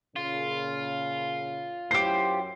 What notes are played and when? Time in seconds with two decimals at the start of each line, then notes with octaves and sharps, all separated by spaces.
0.16 A#2 C#3 F4
1.91 F#2 F#3 E4 G4 C5 C7